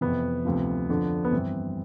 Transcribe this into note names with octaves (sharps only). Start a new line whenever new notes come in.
F2 C3 E3 B3
D2 C3 F3
F2 D3 F3
B3
G2 E3 C4